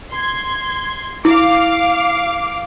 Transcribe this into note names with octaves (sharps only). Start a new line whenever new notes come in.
C6 G#6
E4 F5 D6